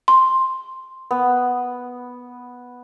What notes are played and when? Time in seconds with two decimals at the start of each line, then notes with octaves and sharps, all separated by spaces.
0.08 C6
1.11 B3